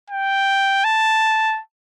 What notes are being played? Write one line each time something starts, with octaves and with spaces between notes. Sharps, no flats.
G5
A5